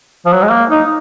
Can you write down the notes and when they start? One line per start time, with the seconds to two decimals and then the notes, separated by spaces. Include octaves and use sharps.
0.26 F3
0.33 F#3
0.42 G#3
0.51 A#3
0.70 D#4